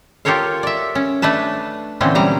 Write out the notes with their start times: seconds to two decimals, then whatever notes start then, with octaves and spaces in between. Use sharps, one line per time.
0.25 F4 G4 A4 A#4 C#5 F5
0.63 D5 E5
0.95 C#4
1.22 A3 D4 B4 A5
2.01 A#2 D3 E3 C4 C#4
2.15 F#3 G3 A#5